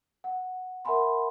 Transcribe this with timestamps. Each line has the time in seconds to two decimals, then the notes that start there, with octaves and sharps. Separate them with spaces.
0.24 F#5
0.85 A#4 E5 F#5 G#5 B5 C6